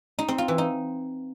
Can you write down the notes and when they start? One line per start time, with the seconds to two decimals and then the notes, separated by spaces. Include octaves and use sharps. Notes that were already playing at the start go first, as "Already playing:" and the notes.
0.19 D#4
0.28 C4
0.38 F4
0.48 E3
0.58 D#4